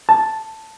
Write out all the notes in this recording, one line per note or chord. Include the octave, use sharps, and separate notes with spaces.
A5